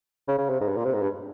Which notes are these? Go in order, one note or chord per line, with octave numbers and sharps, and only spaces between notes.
C#3
C#3
C3
G#2
G2
A#2
C3
G#2
G2